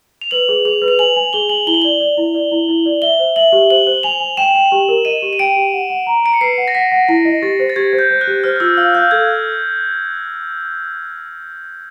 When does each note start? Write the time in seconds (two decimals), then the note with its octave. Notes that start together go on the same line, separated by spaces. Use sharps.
0.21 F7
0.31 B4 F#7
0.49 G#4
0.65 G#4 F7
0.82 B4
0.88 F7
0.99 G#5 F#7
1.16 G#5
1.33 G#4 G7
1.49 G#5 F#7
1.67 E4 G7
1.74 F#7
1.82 D5 G7
2.00 D5
2.18 E4
2.35 D5
2.52 E4
2.68 E4
2.86 D5
3.02 E5 G7
3.19 C5
3.36 E5 F#7
3.52 G4
3.70 C5 F#7
3.87 C5
4.03 G#5 F7
4.20 G#5
4.37 G5 E7
4.55 G5
4.72 G4
4.89 A#4
5.05 D#5 D#7
5.22 G4
5.33 D#7
5.39 G5 D7
5.56 G4
5.73 F#5
5.90 F#5
6.07 A#5
6.24 A#5 D7
6.34 C#7
6.41 B4 C7
6.58 F#5
6.68 A#6
6.75 F#5 B6
6.92 F#5
7.09 E4 A#6
7.25 D#5
7.42 G4 A6
7.59 C5
7.70 A6
7.76 G4 G#6
7.93 C5
7.99 G6
8.10 C5
8.21 F#6
8.27 G4
8.44 C5 F6
8.56 F6
8.60 F4 E6
8.77 F5 F6
8.95 F5 G6
9.11 A4 G#6